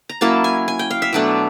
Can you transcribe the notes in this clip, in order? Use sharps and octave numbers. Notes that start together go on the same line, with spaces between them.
A#5
F#3 A#3 C#4 E4 A5
G#5
G#5
G5
F5
E5
B2 F#3 A3 D4